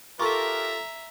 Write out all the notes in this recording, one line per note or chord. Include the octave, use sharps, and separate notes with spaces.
F4 G4 A4 A#4 E5 A#5 C#6 D6